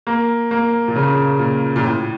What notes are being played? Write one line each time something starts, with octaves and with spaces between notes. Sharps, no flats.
A#3
A#3
A#2
C#3
A#2
A#2
A2